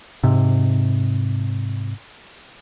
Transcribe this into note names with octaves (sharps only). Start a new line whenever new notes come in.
G#2 C3